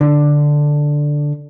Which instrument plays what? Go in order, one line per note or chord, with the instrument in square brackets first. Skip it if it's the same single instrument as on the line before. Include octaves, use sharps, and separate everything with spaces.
[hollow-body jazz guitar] D3